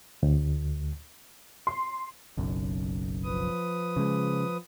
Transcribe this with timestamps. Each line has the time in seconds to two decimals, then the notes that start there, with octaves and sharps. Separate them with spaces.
0.23 D2
1.67 C6
2.37 F#1 B1 F#2
3.24 F3 B4 D#6
3.97 C#3 G#3